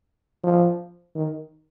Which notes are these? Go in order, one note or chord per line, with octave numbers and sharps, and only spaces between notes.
F3
D#3